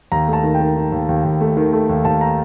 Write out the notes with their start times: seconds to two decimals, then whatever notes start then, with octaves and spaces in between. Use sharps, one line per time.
0.12 D#2 A#5
0.28 A3
0.33 A5
0.43 D#3
0.54 G5
0.60 D#3
0.76 D#3
0.92 D#2
1.09 D#2
1.25 D#2
1.41 A3
1.57 D#3
1.73 A3
1.89 D#2
2.05 D#2 A5
2.21 A#5